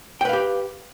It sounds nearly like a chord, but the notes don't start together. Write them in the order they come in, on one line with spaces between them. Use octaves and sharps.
G5 B4 F5 G4